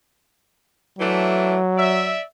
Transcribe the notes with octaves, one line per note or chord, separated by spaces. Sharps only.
E3 F#3 A3 D4
D5 E5